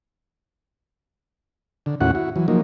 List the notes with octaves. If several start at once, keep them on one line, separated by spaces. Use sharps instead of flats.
D3
D#2 A2 C#4 E4 F#4 F#5
E4 F#4
E3 F#3
F3 F#3 A#3 D#4